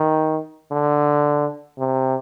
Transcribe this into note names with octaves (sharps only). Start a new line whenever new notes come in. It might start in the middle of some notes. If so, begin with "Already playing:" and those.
Already playing: D#3
D3
C3